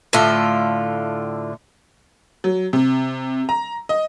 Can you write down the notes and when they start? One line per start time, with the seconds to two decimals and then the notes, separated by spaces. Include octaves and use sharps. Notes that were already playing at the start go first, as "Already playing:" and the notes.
0.13 A2 D3 F4
2.44 F#3
2.73 C3
3.49 A#5
3.89 D#5